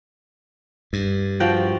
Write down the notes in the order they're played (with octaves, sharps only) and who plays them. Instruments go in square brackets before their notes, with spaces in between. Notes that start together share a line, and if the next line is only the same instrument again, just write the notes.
[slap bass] G2
[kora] F3 F#4 G5